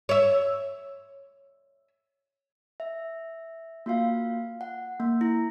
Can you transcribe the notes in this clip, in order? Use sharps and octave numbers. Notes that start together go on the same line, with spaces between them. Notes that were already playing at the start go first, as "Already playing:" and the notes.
C#5 E5
E5
A#3 F4 F#4 F5
F#5
A#3
E4